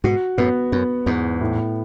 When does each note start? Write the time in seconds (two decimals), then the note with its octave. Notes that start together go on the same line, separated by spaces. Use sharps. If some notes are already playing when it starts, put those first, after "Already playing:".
0.04 G#2 B2 F#4
0.38 F#2 A2 B3
0.72 F#2 B3
1.06 E2 G#2 B3
1.41 A2